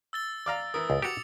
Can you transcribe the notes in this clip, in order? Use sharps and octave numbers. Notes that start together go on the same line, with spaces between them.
E6 A6 G7
D5 F5 A#5
E3 A#4 D#6
C#2
F#4 G4 D6 C#7 F7